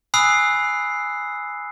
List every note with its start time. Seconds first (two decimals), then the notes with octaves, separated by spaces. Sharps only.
0.14 G#5 B5 D#6 E6 F#6 C7